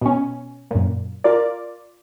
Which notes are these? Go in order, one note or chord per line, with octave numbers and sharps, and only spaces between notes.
B2 C#4
F#2 A#2
F4 A#4 D5